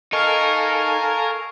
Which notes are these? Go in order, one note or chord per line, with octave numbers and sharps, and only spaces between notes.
D#4 A4 A#4 F5 G#5 C#6 F6 C7